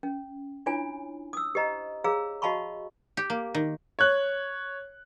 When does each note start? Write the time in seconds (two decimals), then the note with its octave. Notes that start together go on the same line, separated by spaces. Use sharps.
0.03 C#4
0.66 D4 E4 F4 C#5 G#5
1.33 D#6 E6
1.55 G4 C5 D#5 A#5
2.04 G#4 C#5 F5 A#5 E6
2.42 F#4 D#5 F5 A5 B5 C#6
3.17 G4
3.30 A#3
3.54 D#3
3.99 C#5 F#6